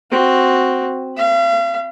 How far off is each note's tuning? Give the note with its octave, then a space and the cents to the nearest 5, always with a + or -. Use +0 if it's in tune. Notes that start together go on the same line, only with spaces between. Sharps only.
C4 +0 F#4 +0
F5 -40 B5 +0